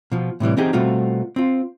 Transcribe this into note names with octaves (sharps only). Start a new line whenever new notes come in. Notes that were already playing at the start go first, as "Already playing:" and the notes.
B2 F3
A2 C3 E3 G3
E3 B3 C4 D#4 G4 G#4
B2 G3 A3 C4 F4 F#4
C4 F4